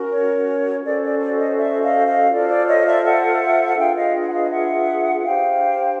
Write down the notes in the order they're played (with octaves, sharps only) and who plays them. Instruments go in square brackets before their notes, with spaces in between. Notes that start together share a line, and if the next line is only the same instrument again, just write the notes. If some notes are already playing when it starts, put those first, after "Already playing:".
Already playing: [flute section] C#4 F#4 A#4
C#5
C#4 F#4 A4 C5 D5
D5
D5
C#5 D#5
D5 E5
D#5 F5
D#5 F5
F4 A4 C5 D5
D5
C#5 D#5
D5 E5
E5 F#5
F#5
D4 F4 G#4 B4 F5 G5
D#5 F5
F#5
D#5 F5
E5 F#5
D4 G4 C5 F5 G5